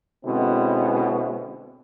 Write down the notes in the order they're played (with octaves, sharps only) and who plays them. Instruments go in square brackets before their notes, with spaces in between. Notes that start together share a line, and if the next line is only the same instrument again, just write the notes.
[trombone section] B2 D3 G#3 C4 C#4 E4